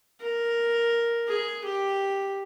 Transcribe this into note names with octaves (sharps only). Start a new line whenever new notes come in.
A#4
G#4
G4